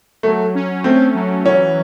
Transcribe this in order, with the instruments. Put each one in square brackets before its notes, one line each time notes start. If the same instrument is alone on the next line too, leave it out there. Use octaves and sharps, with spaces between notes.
[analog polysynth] F#3 [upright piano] A3
[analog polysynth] C#4
[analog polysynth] A3 [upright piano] C4
[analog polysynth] F#3
[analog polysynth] E3 [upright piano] C#4